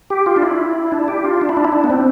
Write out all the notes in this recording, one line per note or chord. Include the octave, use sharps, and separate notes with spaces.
G4
F4
D4
E4
D4
G4
F4
D4
E4
D4
E4
D4
B3
C4